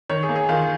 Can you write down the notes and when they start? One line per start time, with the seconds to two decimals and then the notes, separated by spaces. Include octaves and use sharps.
0.09 D#3 C#5
0.23 G#4
0.29 A#3
0.36 G#4
0.49 D#3 F4